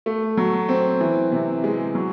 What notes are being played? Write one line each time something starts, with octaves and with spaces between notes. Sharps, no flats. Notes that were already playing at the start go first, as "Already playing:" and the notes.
A3
F#3
C4
E3
C3
G#3
F#3